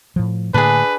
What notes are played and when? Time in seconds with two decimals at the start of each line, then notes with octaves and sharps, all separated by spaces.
0.16 A2 F3
0.54 A2 D3 A#3 D4 G#4 B4